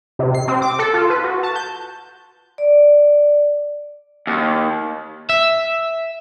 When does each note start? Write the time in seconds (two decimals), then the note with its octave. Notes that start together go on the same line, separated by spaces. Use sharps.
0.19 C3
0.35 C7
0.48 C4
0.62 D6
0.79 A4
0.94 F4
1.10 B4
1.24 F#4
1.43 A5
1.56 G6
2.58 D5
4.27 D#2
5.29 E5